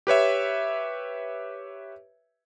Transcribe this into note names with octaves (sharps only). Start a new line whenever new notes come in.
G4 B4 C#5 E5